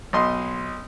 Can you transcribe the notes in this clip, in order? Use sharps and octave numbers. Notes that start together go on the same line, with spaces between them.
B1 D#5 C6